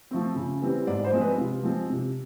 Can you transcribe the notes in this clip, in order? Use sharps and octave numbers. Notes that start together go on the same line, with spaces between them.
F3 A3 C4
C#3
E3 G3 C4
G#2 D5
C5
F3 G#3 C4
B4
C3 F4
F3 G#3 C4
C3